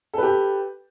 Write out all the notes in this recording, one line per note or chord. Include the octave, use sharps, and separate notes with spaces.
G4 A4 B4